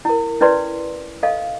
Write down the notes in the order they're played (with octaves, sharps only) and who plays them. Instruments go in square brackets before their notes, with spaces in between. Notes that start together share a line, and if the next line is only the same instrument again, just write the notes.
[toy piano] E4 A#4
C#4 E4 B4 D5 C6
A4 D#5 F5